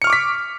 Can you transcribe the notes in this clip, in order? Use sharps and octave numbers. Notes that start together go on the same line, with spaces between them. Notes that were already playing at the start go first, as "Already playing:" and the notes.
C#6 D6 F6 B6 C#7